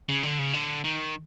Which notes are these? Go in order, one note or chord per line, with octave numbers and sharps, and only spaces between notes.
C#3
D3
C#3
D3
D#3